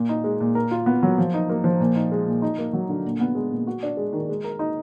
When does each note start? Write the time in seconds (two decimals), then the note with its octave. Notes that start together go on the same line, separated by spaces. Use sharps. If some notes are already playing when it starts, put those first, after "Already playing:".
Already playing: A#2
0.09 D#4
0.24 G#3
0.40 A#2
0.55 A#4
0.71 F4
0.86 B3
1.03 F#3
1.18 F3
1.34 D#4
1.49 A#3
1.64 F3
1.80 A#2
1.96 D#4
2.12 G#3
2.27 A#2
2.42 D#4
2.58 A#3
2.73 F#3
2.89 D3
3.05 A#2
3.20 B3
3.35 G#3
3.52 A#2
3.67 F#4
3.83 D4
3.97 G#3
4.13 D#3
4.29 G#3
4.44 A#4
4.59 D#4